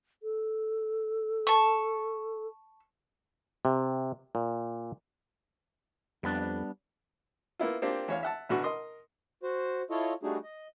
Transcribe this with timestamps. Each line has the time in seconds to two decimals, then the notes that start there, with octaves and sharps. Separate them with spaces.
0.23 A4
1.47 A5 C#6
3.65 C3
4.35 A#2
6.23 F2 G3 B3 D4
7.59 A#3 B3 E4 F4
7.82 A#3 C4 D4 F4 G4
8.08 E2 C#5 F5
8.23 E5 F#5 A5
8.49 A1 B2 D3 F#4 C#6
8.64 A#4 D#5 C6 D#6
9.43 F#4 C5
9.90 E4 F4 A4 C#5 D#5
10.23 G3 A3 D4 D#4 F#4 G#4
10.44 D#5